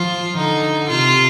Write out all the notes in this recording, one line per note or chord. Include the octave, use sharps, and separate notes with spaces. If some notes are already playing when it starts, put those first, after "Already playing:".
Already playing: F3 F4
D3 D#4
C3 F4